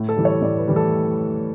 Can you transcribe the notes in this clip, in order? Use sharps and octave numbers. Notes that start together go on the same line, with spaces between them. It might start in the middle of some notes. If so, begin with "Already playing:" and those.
Already playing: A2
A4
E3 G3
C#5
A2 D5
B4
E3 G3
A4